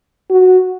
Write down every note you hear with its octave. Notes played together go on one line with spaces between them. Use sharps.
F#4